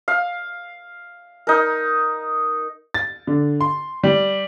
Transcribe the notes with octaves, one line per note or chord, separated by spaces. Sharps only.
F5
D#4 A#4
A6
D3
C6
G3